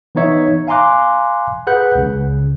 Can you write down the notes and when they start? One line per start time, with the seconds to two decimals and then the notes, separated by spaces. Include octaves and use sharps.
0.15 E3 B3 D#4 C#5 E5
0.67 F5 G#5 A#5 C6 D6 F#6
1.67 G#4 B4 F#5 F#6 G6
1.95 C#2 C#3